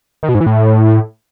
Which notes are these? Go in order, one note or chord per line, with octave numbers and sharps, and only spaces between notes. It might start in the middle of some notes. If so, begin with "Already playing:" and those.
D#3
B2
G#2
E3
A2